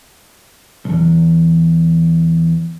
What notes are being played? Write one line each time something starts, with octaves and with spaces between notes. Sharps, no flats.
B1 E2